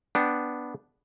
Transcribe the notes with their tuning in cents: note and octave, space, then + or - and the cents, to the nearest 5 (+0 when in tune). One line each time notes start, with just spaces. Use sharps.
B3 +0 D4 +0 G5 +0